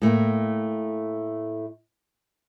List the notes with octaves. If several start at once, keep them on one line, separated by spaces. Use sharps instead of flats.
A2 A3 A#3 G5